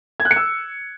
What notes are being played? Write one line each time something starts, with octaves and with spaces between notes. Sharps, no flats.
G#6
F#6
C#7
E6